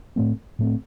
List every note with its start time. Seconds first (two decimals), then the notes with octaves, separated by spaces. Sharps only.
0.16 A2 A3 C4
0.59 A2 A3 C4